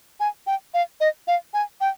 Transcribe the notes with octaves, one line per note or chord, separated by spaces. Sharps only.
G#5
G5
F5
D#5
F5
G#5
G5